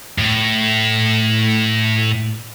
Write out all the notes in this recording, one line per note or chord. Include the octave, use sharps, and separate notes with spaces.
A2